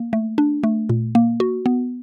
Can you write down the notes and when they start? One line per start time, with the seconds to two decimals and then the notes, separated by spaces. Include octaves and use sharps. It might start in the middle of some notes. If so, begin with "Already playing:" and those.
Already playing: A#3
0.13 A3
0.38 D4
0.63 A3
0.89 A#2
1.15 A#3
1.40 F#4
1.66 B3